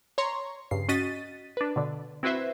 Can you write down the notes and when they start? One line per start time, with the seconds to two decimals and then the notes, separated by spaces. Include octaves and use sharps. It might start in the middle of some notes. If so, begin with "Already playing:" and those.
0.18 C#5 A#5 C6 C#6
0.71 G2 C#3 C7
0.89 C#4 F#4 D#5 A6 B6 D#7
1.57 D4 B4
1.76 B2 D3
2.23 C4 E4 F#4 B4 C5 E5